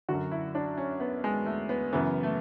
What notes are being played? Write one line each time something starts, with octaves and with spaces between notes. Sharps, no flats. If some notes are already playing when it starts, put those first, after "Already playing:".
F#2 D3 F#4
E4
D4
C#4
B3
G#3
A3
B3
F#2 C#3 E3 B3
A3